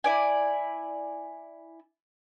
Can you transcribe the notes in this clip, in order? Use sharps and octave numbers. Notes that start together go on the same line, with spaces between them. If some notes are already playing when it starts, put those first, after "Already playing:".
E4 D5 G#5